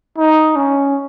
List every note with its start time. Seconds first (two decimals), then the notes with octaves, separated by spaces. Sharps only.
0.18 D#4
0.56 C#4